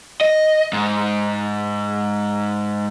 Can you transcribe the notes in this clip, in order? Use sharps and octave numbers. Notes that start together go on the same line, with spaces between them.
D#5
G#2